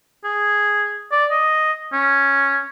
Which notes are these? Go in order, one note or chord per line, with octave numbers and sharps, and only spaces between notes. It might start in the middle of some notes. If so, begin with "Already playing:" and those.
G#4
D5
D#5
C#4